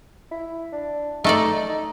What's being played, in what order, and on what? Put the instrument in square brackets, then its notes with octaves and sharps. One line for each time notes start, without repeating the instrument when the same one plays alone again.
[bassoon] E4
D4
[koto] A3 A4 D5 [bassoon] D#4
[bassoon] D#4